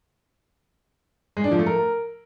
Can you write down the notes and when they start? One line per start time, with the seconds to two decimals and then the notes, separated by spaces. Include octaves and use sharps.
1.37 G#3
1.44 D4
1.51 F3
1.59 A3
1.66 A#4